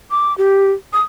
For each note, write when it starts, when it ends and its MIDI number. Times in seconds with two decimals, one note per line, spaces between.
0.11 0.36 86
0.38 0.72 67
0.93 1.02 87